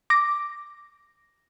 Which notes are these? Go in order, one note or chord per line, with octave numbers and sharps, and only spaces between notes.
D6 A#6